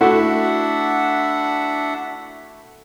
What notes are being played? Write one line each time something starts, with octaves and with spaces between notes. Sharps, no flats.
A3 D4 E4 F#4 E5 F#5